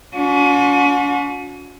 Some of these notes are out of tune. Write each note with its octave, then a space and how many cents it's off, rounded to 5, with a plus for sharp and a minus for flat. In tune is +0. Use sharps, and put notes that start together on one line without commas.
C#4 +45 F#4 -45